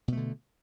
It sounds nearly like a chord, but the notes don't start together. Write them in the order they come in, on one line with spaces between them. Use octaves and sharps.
B2 A3 D3